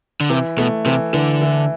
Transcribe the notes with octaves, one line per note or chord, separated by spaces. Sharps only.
D3
C3 E3
B2 A3
C3 E3
D3 E3
E3